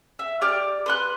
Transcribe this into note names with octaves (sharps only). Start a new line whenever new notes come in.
E5
G4 D5 F6
B4 C6 F#6